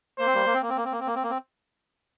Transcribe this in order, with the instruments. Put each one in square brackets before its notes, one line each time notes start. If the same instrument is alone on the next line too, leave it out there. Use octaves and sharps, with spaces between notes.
[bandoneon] A#3 [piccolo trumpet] C5
[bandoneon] C4
G3 A#3
A#3
C4
A#3
C4
A#3
C4
A#3
C4
A#3
C4
A#3
C4